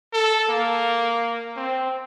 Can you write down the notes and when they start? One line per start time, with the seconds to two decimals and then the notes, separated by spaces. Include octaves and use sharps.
0.13 A4
0.49 A#3
1.56 C4